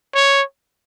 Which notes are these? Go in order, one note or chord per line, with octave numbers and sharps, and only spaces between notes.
C#5